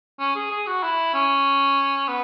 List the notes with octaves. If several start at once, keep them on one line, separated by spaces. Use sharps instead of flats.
C#4
G#4
G#4
F#4
E4
C#4
B3